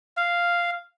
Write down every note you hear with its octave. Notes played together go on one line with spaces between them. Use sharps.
F5